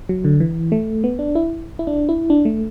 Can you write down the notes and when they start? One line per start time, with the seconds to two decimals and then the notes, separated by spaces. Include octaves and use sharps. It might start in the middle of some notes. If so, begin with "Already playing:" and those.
0.09 F#3
0.24 D3
0.40 E3
0.72 A3
1.04 B3
1.19 D4
1.35 E4
1.79 E4
1.87 D4
2.09 E4
2.30 D4
2.45 A3